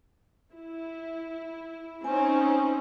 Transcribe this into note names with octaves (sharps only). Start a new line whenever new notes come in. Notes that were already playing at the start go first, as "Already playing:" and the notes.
E4
C4 C#4 D#4 G#5